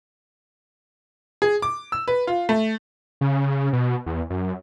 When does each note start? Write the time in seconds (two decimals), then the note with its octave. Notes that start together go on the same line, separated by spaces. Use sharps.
1.42 G#4
1.62 D6
1.92 E6
2.08 B4
2.27 F4
2.49 A3
3.21 C#3
3.73 B2
4.06 E2
4.30 F#2